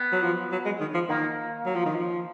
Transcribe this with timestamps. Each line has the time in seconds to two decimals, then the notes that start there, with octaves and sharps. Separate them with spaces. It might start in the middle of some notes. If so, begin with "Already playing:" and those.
Already playing: B3
0.12 F#3
0.23 F3
0.52 F#3
0.65 G#3
0.80 D#3
0.94 F3
1.09 D#3 A#3
1.66 F#3
1.75 F3
1.85 D#3
1.95 F3